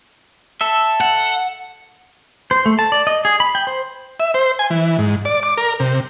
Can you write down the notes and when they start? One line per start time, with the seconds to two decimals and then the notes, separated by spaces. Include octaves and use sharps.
0.61 A4 E5
1.01 F#5
2.51 C5
2.66 A3
2.79 A5
2.92 D5
3.07 D#5
3.25 G#4
3.40 B5
3.55 G5
3.67 C5
4.20 E5
4.34 C5
4.59 G#5
4.70 E3
4.98 G#2
5.25 D5
5.43 D6
5.58 A#4
5.80 C3